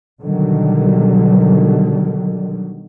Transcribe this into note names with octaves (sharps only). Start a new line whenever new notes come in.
B2 D3 D#3 F#3 G3